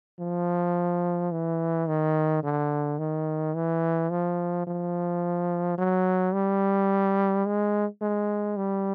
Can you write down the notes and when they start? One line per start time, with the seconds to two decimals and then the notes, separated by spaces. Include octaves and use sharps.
0.20 F3
1.32 E3
1.88 D#3
2.43 D3
2.99 D#3
3.55 E3
4.10 F3
4.67 F3
5.78 F#3
6.34 G3
7.46 G#3
8.01 G#3
8.57 G3